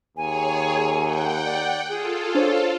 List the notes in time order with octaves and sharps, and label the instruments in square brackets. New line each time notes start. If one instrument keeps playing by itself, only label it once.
[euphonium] D#2 [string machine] G#4 C#5 [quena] G#5
[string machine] F#5 G5
[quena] D5
[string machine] F4 A4 [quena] G#4
[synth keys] D4 C5 C#5